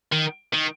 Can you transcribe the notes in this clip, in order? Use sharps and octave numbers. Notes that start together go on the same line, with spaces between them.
D#3
D#3